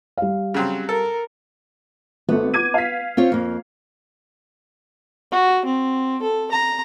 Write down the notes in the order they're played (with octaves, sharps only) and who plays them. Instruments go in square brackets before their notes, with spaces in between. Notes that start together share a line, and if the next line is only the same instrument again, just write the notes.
[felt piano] G3 F5
[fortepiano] C#3 F#3 C4
[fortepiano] A4 [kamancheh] A#4
[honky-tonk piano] G#1 A3 [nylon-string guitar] B3
[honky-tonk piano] D6 G#6 D#7
F5 B6
[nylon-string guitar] C4 F4 C#5
F2 A#3
[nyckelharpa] F#4
C4
A4
A#5